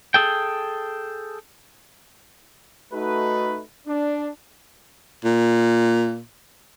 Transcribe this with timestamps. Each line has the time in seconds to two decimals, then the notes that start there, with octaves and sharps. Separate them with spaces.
0.14 G#4 A4 G5
2.93 A3 D#4 F#4 B4
3.87 D4
5.25 A#2